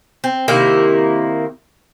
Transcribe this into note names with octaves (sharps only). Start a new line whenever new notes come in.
C4
C3 D#3 A#3 E4